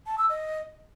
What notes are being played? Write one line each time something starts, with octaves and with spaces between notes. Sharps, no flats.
A5
E6
D#5